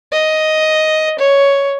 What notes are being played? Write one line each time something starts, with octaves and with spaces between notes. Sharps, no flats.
D#5
C#5